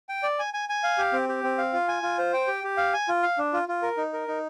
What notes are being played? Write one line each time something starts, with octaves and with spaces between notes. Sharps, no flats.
G5
D5
G#5
G#5
G#5
F5
G4
C4
G4
C4
F5
F4
G#5
F4
C5
G5
G4
G4
F5
G#5
F4
F5
D4
F4
F4
A#4
D#4
A#4
D#4